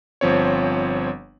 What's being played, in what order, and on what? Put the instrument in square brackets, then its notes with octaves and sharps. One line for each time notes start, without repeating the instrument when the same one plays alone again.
[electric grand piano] G1 F3 C4 C#5